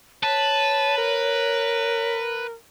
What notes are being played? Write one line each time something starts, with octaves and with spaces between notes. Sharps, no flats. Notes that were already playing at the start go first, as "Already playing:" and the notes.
B4 C#5 A5
A#4